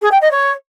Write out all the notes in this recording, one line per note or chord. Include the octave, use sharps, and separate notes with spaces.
G#4
G5
D#5
C#5